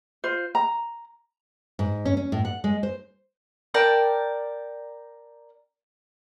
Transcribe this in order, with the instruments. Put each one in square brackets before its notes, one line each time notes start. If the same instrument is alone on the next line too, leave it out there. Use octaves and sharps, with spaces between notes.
[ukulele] F4 C5
A#5
[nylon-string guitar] G#2
C#4
C#4
A2
F#5
G#3
C5
[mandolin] A#4 D5 G5 A5